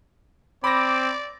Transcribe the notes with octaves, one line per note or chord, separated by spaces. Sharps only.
C4 D5 B5 D6 A#6